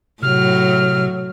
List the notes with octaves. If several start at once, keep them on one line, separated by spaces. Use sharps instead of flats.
A2 C3 F#3 F6